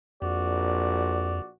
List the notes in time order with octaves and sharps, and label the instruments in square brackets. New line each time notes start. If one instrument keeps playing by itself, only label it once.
[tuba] A#1 [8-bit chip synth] F2 [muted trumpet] F#4 [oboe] D5